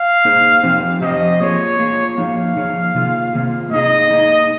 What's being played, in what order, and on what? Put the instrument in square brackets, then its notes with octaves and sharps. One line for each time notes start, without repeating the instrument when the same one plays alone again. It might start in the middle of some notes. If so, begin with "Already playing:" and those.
Already playing: [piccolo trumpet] F5
[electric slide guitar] A#3 D#4 G#4 C5
F3 C4 G4 C5
[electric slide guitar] F3 C4 G4 C5 [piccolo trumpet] D#5
[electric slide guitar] A#3 F4 G#4 [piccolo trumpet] C#5
[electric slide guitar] A#3 F4 G#4
[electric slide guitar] F3 A#3 D#4 G#4 C#5 [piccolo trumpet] F5
[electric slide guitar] F3 A#3 D#4 G#4 C#5
C3 D#3 A#3 F4 G#4
C3 D#3 A#3 F4 G#4
[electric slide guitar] A#3 D#4 G#4 [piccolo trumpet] D#5
[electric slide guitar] A#3 D#4 G#4